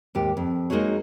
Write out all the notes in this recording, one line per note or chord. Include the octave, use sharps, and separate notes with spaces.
D#2 G#2 G4
F2
G#3 A#3 D#4 F#4 G#4 C#5